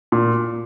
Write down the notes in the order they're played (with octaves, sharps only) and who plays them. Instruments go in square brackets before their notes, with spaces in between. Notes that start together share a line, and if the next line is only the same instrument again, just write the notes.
[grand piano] A#2